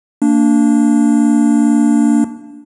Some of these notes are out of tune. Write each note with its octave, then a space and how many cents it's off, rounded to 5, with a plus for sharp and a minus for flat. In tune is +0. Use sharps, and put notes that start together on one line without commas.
A#3 -25 D4 -10